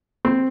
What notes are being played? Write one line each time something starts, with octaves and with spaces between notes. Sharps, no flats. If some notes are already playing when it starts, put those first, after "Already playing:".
C4